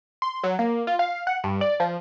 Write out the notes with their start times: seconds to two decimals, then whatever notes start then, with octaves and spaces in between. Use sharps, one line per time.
0.22 C6
0.44 F#3
0.59 A#3
0.87 F4
0.99 F5
1.27 F#5
1.44 G2
1.61 D5
1.80 F3